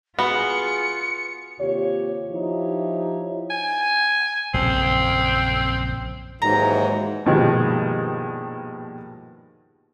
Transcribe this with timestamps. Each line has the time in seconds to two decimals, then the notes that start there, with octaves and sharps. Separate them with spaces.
0.19 B3 F4 F#4 G#4 C#7
1.58 D#2 C3 F4 G4 C#5
2.31 F3 D#4 E4 G4 C#5
3.50 G#5
4.54 A#1 F#2 C#3 C4
6.42 D#2 G#2 E3 F#3 A#5
7.26 A#1 G2 B2 D#3 F3 G#3